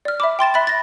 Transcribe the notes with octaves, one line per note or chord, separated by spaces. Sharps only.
D5 F6
E5 B5 D6
G5 C6 A6 E7
E5 B5 F#6 A6
A6 A#6